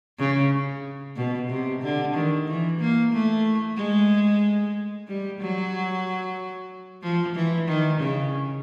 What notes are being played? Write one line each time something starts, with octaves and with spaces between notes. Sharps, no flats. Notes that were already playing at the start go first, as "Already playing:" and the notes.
C#3
B2
C3
D3
D#3
E3
A#3
A3
G#3
G3
F#3
F3
E3
D#3
C#3